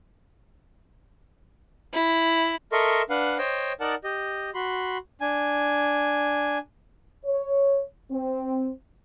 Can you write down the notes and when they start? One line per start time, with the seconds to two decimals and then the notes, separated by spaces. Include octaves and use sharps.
1.94 E4
2.72 A4 A#4 D#5 E5 C6 C#6
3.10 D4 B4 F5 F#5
3.38 C5 C#5 D#5 G5
3.80 D#4 A#4 D5 F#5 A5
4.04 G4 D#5
4.54 F#4 B5 C6
5.21 D4 G#5
7.25 C#5
8.11 C4